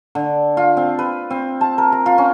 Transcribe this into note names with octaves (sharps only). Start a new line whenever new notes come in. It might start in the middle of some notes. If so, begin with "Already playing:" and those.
D3
F4
C4
B4
C4
A5
A#4
A#5
F4
C#4